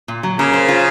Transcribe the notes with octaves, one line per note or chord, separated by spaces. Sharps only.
A#2
F#3
C#3 A#3
C5
F4